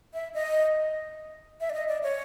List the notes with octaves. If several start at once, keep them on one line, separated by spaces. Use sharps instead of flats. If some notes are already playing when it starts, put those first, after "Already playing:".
E5
D#5
E5
D5
D#5
D5
C#5